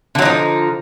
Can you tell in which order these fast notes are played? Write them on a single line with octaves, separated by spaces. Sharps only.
D3 F#3 D#4 F3